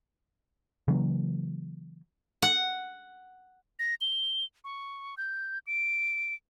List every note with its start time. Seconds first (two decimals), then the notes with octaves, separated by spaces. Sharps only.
0.88 C#3 E3 F#3 A#3
2.42 F#5
3.79 A#6
4.01 G7
4.64 C#6
5.17 G6
5.67 D7